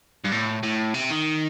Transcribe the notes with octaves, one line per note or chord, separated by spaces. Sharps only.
G2
A2
A2
C3
D#3